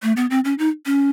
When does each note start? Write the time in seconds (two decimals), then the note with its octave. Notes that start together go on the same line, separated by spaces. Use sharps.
0.03 A3
0.17 B3
0.30 C4
0.45 C#4
0.59 D#4
0.86 C#4